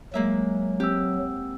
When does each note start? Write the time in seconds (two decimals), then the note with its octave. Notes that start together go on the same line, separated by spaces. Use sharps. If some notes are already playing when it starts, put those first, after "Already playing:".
0.14 F#3 G#3 A#3 E5
0.80 C4 G4 E6